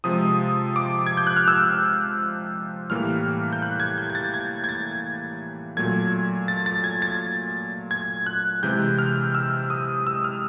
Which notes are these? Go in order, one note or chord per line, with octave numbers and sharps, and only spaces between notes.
C3 F3 G#3 D#6
D6
G#6
G6
F#6
F6
E6
A2 E3 G3 A#3 F6
G6
F#6
G#6
G6
G#6
A6
G#6
G#6
A6
A#2 F#3 A3 G#6
A6
A6
G#6
A6
G#6
F#6
C3 E3 G#3 G6
F6
E6
D#6
E6
F6